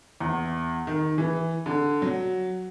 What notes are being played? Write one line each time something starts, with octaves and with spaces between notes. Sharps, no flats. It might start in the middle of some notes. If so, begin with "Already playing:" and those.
E2
D#3
E3
D3
F#3